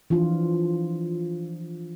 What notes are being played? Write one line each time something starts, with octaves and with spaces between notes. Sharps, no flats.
E3 F3 D4 F4